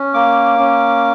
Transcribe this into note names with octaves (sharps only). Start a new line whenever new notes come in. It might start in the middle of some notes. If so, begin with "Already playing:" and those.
Already playing: C#4
A#3 D6
C#4